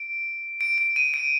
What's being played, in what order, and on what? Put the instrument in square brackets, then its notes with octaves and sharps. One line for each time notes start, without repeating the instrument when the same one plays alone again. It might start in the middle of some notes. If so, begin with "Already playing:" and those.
Already playing: [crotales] D7
D7
D7
D#7
D7